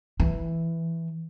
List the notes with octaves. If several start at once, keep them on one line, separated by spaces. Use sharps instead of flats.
E3